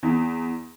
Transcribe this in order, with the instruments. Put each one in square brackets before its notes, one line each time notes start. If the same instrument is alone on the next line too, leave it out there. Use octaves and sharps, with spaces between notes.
[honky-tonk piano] E2